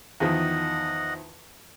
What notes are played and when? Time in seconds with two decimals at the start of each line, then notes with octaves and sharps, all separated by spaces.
0.20 E2 D#3 F3 D#5 F#5